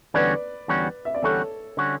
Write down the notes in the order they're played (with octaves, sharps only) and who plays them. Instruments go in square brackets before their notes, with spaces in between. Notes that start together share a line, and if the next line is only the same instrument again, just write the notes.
[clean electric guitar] E2 D3 G3 C#4 F#4 [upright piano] B4 D5
[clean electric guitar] E2 D3 G3 C#4 F#4
[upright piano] E5
D5
[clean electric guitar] E2 D3 G3 C#4 F#4 [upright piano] A4 C#5
[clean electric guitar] D3 G3 C#4 F#4